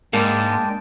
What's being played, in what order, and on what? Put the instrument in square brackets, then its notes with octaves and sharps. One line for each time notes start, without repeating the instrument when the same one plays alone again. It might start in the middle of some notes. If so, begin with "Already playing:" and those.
[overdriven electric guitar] G#2 [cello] G#3 [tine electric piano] A#3 [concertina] D4 G5 A5